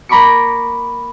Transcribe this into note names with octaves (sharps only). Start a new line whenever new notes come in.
A#3 A#5 B5 C#6 D6 C#7